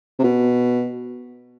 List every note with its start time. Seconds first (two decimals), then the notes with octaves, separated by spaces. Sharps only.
0.19 C3
0.24 B2